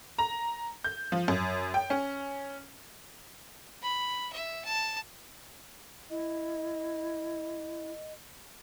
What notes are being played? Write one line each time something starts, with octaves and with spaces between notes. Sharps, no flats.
A#5
G6
F3
F#2
G5
C#4
B5
E5
A5
E4 D#5